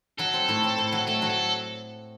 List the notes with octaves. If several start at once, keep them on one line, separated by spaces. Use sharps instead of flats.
F#3 A4
C4
A2
C4
A2
F#3
A3 A4
F#3
A4